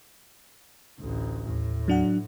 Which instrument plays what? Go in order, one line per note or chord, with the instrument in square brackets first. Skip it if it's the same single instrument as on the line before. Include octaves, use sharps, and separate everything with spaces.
[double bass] A1 D2
[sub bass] D#2 [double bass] A2
[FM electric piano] F#3 D4 F#5